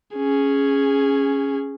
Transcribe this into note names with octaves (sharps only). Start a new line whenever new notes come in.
C#4 G#4